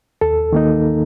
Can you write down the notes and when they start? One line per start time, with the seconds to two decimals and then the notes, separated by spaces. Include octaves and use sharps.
0.21 D#2 A4
0.53 D#3 A#3 D#4